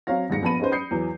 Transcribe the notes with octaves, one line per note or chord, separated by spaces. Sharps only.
F#3 C4 C#5 F5 A#6
D#1 G#2 A#6 C#7
A#1 B3 A5 B5 D#7
C#4 D#4 G#4 B4 C5
B5 D#6 G6 C7 C#7
E2 E3 F#3